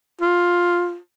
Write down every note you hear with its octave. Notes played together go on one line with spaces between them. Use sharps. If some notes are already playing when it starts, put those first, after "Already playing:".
F4